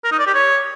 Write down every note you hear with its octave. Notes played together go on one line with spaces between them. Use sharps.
A#4
D#4
D5
G4
C#5